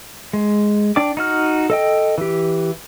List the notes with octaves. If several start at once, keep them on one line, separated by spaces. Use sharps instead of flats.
G#3
D4 D5 G5 D6
D#4 F#4 F6
A4 D#5 G5
E3 G4